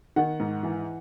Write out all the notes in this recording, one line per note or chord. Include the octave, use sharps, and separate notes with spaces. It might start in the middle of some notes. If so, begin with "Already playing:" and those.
D#3 F#5
G#2
E3